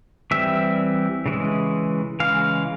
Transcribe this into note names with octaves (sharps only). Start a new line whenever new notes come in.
E3 G3 C4 E5
C#3 E3 G#3
C#3 E3 G#3 F5